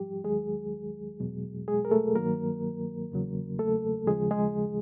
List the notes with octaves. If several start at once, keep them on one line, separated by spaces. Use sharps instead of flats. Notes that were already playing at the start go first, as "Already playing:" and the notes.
Already playing: G#2 F3 G3 G4
D#2 D#3 F#3 G#3 G#4
E2 B2 F#3
G#3 G#4
A#4
A3 A4
G2 D#3 F#3 A#3 A#4
E2 C#3 F#3
A3 A4
D#2 C#3 F3 G#3 G#4
G#3 G#4